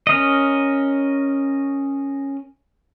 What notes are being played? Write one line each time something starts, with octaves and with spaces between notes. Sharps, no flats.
C#4 A#4 D#5